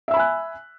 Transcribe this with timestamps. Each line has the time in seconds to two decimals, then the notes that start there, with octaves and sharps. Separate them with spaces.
0.08 E5
0.11 E6
0.14 B5
0.17 G#5
0.19 F#6